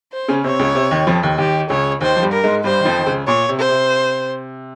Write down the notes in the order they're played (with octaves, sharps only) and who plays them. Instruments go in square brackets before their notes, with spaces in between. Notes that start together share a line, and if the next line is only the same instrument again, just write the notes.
[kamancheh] C5
[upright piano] C#3 C#4
[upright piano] C3 C4 [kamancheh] C#5
[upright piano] C#2 C#3
C3
D#2 D#3
F2 F3
D#2 D#3
[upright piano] D#2 D#3 [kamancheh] G4
[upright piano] C#2 C#3 [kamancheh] C#5
[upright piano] D#2 D#3 [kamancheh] C5
[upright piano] F3
G2 G3
[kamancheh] A#4
[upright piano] G#2 G#3
[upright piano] G2 G3 [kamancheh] C5
[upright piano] D#3
F2 F3
D#3
C#2 C#3
[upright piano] A#2 [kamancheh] C#5
[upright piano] C3
[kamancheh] C5
[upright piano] C3